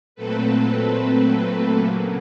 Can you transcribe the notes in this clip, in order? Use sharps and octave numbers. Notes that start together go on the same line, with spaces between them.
A#2 F#3 A3 C4 A4 B4
C#3 F#3 A#3